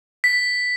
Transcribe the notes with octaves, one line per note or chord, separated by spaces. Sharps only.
B6